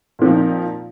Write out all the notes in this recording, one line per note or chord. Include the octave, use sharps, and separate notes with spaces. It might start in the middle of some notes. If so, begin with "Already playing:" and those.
A#2 F3 C4 D#4